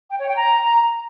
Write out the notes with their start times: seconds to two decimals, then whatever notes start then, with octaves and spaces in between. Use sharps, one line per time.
0.10 G5
0.18 C#5
0.27 G5
0.36 A#5